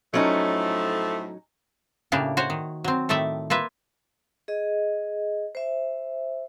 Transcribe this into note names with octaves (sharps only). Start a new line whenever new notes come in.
A2 F3 F#3 A3 C#4 D#4
A2 C#3 A#3 D4 G4
F#4 C5 C#5
D#3
F#3 C4
A2 D#3 A3 D5 E5
A#3 F4 B4 E5
G#4 D#5
C5 E5